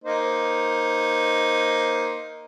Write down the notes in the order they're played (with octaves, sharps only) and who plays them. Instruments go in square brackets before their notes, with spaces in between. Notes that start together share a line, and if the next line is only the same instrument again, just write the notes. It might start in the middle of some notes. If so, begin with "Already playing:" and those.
[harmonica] A#3 D#4 C5